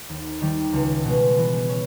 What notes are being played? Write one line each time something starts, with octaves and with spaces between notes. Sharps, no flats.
D#2
D#3 G3
C#2
B2 G#3
E3
C#4